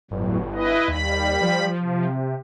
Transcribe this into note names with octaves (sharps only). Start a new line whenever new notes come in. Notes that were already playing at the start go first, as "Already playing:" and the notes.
G1 E2 A2 F#3
E4 B4 D#5
D#2 G3 B5
F3
C3